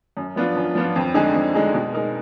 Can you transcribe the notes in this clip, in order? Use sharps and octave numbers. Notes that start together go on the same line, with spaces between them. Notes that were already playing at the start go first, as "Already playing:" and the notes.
F#2
F3 B3 D4 F4
F#2
F3 B3 D4 F4
F2
D3 G#3 D#4 G#4
F2
D3 G#3 D#4 G#4
B2
G#3 D#4 A#4